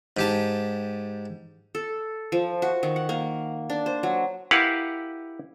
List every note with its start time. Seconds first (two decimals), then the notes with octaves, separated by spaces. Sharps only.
0.17 G#2 G4 A5
1.75 A4
2.32 F3
2.62 F#4
2.83 D#3
2.96 F#5
3.09 A#3
3.70 D4
3.86 C5
4.03 F#3
4.51 E4 G4 A#4 B4 F5 F#5